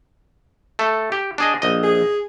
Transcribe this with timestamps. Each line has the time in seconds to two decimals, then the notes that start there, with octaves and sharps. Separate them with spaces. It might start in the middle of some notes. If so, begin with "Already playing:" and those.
0.79 A3 A4
1.12 G4
1.38 D4 G#4 D#5
1.62 A#1 D#5
1.83 G#4